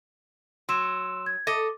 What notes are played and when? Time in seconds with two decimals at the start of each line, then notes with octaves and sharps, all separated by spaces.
0.69 F#3 C6 E6 E7
1.26 G#6
1.47 A4 D#5 D6